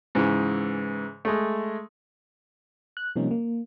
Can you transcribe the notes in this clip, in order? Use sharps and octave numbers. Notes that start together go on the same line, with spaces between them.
G#2 C#3 E3
G#3 A3
F#6
C3 F3 G3 A#3 C#4 D#4
A#3